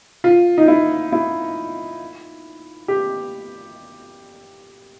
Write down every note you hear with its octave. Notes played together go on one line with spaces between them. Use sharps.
F4
D#4
E4
E4
G4